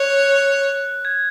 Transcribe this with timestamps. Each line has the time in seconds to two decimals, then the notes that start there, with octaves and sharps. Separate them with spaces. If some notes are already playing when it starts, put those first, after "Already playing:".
Already playing: C#5 F#6
1.05 G#6